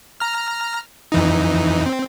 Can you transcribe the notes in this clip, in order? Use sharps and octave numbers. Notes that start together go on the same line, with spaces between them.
A#5 F6
F2 E3 D#4
C4